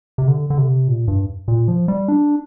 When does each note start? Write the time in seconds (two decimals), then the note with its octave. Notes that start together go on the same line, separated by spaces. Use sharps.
0.18 C3
0.28 D3
0.50 D3
0.58 C3
0.88 A#2
1.08 G2
1.48 A#2
1.68 F3
1.88 G3
2.08 D4